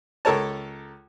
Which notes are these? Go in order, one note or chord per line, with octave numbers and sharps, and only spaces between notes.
C#2 A4 A#4 C#5 A5